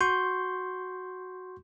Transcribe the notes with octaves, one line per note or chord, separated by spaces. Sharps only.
F#4 C6 C#6 G6